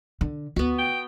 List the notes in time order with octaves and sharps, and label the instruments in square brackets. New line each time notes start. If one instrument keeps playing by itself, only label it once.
[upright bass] D3
[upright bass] D2 [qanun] B3 F#4
[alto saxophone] G5